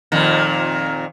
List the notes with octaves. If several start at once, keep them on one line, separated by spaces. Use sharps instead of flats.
F2 A#2 D#3